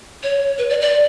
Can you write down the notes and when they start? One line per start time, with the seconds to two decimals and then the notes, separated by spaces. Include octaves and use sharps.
0.23 C#5
0.58 B4
0.70 D5
0.81 D5